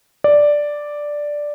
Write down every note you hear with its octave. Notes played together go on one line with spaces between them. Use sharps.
D5